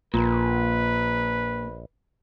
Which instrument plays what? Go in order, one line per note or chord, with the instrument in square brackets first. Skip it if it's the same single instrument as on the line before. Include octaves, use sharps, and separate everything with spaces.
[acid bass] A#1 [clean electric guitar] A#2 [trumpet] B4